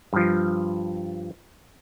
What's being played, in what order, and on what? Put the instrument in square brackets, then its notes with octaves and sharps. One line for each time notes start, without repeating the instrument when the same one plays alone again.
[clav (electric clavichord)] G2 F3